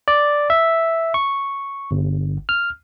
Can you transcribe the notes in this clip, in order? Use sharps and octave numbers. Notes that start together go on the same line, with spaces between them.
D5
E5
C#6
G1
F6